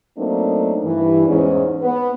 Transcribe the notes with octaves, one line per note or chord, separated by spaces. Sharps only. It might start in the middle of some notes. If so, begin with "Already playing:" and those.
F#3 A3 A#3 C4 D4 D#4
G2 E3
E2 G#2 C#4
B3